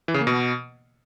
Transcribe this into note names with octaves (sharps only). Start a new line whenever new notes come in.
E3
C#3
A#3
B2